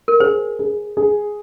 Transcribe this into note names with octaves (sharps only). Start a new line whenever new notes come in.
A#4
G#4 C5
G#4
G#4